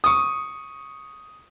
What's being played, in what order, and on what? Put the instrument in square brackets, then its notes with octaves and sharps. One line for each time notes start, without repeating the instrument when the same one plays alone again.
[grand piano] C#6 D#6